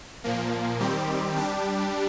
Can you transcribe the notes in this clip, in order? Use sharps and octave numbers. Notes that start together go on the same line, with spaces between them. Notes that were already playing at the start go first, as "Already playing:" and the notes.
A#2 F3 A#3
D#3 G3 C4 G4
G3 D4 G4